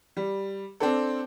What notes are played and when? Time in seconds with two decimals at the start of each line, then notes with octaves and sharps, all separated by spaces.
0.17 G3
0.80 C4 D4 A4